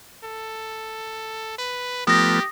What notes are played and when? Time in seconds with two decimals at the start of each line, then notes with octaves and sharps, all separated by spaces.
0.23 A4
1.58 B4
2.07 F3 A3 B3 G4 D#6 A#6